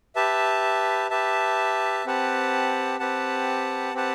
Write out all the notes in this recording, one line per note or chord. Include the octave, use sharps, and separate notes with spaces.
G4 B4 E5 A5
G4 B4 E5 A5
C4 G4 B4 F#5 A5
C4 G4 B4 F#5 A5
C4 G4 B4 F#5 A5